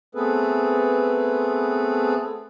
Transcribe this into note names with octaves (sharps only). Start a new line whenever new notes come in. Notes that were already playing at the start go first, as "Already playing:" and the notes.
A3 B3 C4 G#4 A4 B4